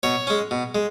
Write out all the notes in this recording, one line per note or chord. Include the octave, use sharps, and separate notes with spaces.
B2 C#5
G#3 C#4
B2
G#3